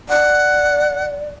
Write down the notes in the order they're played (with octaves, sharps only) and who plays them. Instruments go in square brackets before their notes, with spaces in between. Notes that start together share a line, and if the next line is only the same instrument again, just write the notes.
[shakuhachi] D5 [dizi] F#5